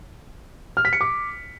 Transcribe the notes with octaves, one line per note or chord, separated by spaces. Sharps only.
F6
B6
C#7
D6